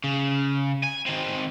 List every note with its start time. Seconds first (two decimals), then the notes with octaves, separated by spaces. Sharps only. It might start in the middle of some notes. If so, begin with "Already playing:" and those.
0.04 C#3
0.84 G#5
1.06 D#3 C4